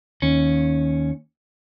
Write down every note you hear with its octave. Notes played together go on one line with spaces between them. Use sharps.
D#2 C#4